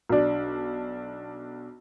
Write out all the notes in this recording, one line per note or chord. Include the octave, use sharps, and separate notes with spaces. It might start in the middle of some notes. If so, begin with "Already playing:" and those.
B1 D4